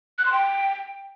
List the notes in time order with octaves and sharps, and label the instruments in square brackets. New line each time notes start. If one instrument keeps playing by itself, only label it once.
[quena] F#6
C6
G5